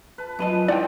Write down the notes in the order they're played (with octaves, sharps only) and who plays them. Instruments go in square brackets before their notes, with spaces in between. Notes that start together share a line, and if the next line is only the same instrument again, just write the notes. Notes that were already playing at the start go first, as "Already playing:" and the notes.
[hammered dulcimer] B4 A5
[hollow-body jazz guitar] F#2 B4 D#5 [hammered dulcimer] F3
[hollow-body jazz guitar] G3 D#4 E4 [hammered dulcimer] C4 [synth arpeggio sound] D5 F#5 G5